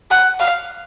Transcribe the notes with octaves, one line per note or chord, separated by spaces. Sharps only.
F#5
F5